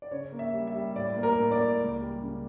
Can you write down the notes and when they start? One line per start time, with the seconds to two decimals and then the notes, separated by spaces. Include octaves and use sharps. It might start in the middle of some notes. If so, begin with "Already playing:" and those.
0.02 D5
0.11 C#3 C#5
0.32 A#3
0.39 E5
0.53 G3
0.67 E5
0.74 G3
0.96 A2 D5
1.16 A#3
1.23 A#4
1.37 A2
1.51 D5
1.59 A#3
1.79 C#2
2.01 G3
2.22 C#3